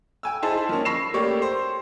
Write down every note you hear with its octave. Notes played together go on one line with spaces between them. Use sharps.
G5 G#5 E6
D#4 E4 G#4 C5 A5
F3 A#3 C#4
B5 C#6 E6 A#6 C7 E7
A3 A#3 G4 C#5 D5
C5